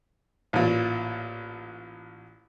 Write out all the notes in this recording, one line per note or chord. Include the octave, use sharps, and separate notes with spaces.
A1 A#2